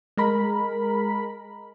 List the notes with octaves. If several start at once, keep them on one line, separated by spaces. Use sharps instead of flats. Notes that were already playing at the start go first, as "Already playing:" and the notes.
G#3 A#4 B5